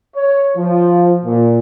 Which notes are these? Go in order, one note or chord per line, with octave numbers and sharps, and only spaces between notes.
C#5
F3
A#2